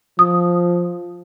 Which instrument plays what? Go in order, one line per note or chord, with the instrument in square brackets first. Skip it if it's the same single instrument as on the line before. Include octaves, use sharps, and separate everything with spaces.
[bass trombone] F3 [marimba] D#6